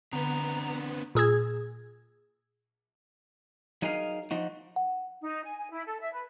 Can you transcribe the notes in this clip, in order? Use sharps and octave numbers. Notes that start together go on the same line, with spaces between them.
D3 B3 C4 D4 B4 A#5
A#2 G#4 E6 G#6
F#3 D#4 G#4 A#4 D#5 F5
F3 D#4 F#4
F#5
D#4
G#5
G#5
E4
A4
E5
B4